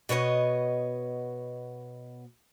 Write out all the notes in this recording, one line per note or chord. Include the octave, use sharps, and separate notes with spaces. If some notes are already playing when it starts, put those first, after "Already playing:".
B2 B3 C#5 D#5